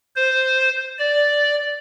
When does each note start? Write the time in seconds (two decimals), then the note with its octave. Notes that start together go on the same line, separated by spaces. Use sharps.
0.16 C5
0.99 D5